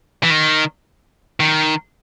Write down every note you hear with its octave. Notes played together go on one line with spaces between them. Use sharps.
E3
D#3
D#3